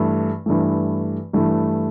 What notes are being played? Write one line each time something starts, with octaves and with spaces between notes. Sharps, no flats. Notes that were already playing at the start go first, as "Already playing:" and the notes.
Already playing: G2 E3 A3
G2 E3 A3
G2 E3 A3